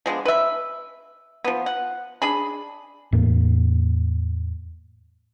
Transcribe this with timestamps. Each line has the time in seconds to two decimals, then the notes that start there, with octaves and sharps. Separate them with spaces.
0.06 F3 G#3 B3 D4
0.25 B4 E5
1.44 F3 B3
1.66 F#5
2.22 D4 G#4 B5
3.12 E2 A2 A#3